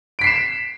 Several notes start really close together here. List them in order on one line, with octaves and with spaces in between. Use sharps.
D7 B6 C7 E7